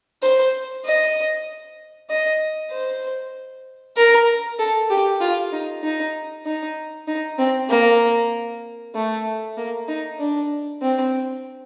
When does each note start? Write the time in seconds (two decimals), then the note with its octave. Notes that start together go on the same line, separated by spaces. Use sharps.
0.22 C5
0.85 D#5
2.10 D#5
2.72 C5
3.96 A#4
4.59 A4
4.90 G4
5.21 F4
5.52 D#4
5.83 D#4
6.46 D#4
7.08 D#4
7.38 C4
7.70 A#3
8.95 A3
9.57 A#3
9.88 D#4
10.19 D4
10.81 C4